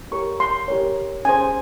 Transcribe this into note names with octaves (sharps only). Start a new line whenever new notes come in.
G4 A#4 C#5 C#6
C6
G4 A#4 C#5
C#4 G#4 C5 G#5